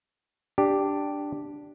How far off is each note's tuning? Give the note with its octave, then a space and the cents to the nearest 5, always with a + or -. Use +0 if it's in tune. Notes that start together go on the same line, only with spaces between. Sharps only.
D4 +0 G4 +0